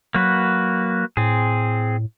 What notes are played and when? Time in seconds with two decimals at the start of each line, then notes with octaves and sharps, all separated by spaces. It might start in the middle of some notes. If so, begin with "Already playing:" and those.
0.15 F#3 A#3 F#4 B4
1.17 A2 C4 G#4